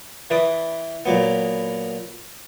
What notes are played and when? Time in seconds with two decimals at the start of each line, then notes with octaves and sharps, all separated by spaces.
0.30 E3 B4 D5 D#6
1.06 A#2 F#3 B3